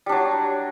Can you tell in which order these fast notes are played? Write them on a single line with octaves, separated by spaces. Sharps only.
G3 D4 F#3